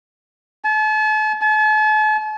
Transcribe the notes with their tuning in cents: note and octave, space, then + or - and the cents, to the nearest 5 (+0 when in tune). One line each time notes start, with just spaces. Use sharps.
A5 -40
A5 -45